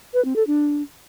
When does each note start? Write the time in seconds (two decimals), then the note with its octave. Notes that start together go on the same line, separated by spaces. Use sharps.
0.14 B4
0.25 C4
0.36 A4
0.47 D4